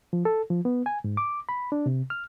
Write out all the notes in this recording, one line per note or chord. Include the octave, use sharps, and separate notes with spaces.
F3
A4
F3
B3
G#5
G#2
D6
B5
D4
C3
F6